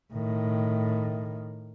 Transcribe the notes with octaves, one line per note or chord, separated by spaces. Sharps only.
A2 D#3